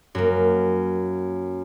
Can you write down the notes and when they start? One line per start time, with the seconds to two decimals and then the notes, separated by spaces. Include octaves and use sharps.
0.15 F#2 A#3